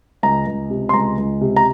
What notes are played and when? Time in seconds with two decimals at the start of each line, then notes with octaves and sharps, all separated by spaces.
0.23 C#2 A#5
0.46 C#2
0.70 C3
0.89 C6
0.93 C#2 A#5
1.18 C#2
1.41 C3
1.56 A#5